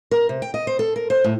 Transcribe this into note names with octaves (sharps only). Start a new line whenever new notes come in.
A#4
C3
G5
D#5
C5
A4
A#4
C5
A2